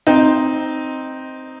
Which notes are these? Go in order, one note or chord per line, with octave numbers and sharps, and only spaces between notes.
C4 D#4